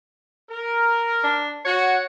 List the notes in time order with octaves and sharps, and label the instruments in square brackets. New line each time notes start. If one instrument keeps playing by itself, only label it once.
[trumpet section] A#4
[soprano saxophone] D4
[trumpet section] F#4 [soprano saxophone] C#5